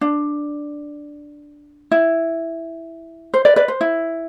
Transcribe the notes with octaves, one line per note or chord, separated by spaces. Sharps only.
D4
E4
C5
B4 D5
B4 D5
C5
E4